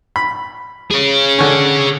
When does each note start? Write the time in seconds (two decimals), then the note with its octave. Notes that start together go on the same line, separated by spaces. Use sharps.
0.16 B5
0.91 G#4 C#5
1.38 D3 C#4